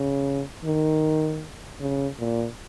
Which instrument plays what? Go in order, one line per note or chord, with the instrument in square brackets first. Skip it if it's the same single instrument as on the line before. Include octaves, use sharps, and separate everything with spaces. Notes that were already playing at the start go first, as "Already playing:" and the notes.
Already playing: [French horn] C#3
D#3
C#3
A#2